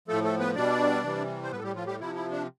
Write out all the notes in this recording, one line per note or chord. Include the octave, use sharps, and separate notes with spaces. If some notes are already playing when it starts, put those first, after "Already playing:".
A2 F3 A3 A4
A3 A4
B3 B4
B2 G3 D4 D5
C3 E3 G3
C5
A2 G3 B3 B4
A4
G3 G4
F3 F4
G3 G4
C3 F3 E4
E4
D4